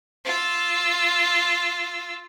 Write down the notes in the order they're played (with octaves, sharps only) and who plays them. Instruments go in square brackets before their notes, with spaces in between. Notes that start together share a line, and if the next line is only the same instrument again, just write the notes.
[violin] F4 E6